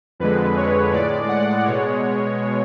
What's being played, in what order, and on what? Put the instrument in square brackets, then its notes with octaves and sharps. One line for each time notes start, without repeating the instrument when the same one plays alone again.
[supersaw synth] F2 D3 G#3 B4
C#5
A2 G#3 D5
F#5
B2 G#3 C#5